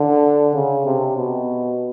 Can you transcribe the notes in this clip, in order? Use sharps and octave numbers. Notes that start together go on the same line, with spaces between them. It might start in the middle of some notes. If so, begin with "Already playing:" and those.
Already playing: D3
C#3
C3
B2